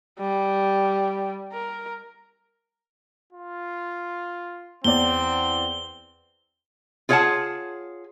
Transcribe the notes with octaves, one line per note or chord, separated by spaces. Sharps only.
G3
A#4
F4
E2 C4 D5 G7
F4 G#4 C#5 F5 F#5 A5